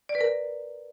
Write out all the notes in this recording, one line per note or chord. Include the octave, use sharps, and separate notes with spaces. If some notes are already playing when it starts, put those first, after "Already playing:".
D5
B4
A#4